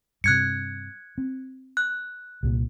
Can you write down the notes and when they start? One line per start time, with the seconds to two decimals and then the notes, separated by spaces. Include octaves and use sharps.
0.24 G2 C3 F#6 G#6 C#7
1.18 C4
1.77 F#6
2.43 C2 A#2